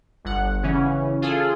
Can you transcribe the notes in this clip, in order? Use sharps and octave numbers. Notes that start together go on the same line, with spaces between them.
G1 F#5
C#3 E3 C#4
F4 G#4 A4